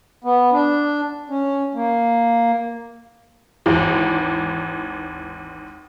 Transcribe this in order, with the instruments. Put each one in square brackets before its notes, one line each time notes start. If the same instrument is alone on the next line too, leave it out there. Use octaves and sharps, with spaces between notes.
[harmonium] B3
D4
C#4
A#3
[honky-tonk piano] G#1 D#2 E3